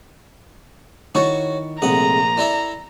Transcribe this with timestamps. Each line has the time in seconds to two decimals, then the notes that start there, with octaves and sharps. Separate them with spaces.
1.15 D#3 E4 F#4 C#5 A5 C#6
1.82 A#1 C3 G#3 A3 F#5 A#5 D#6
2.37 E4 A4 D5 E5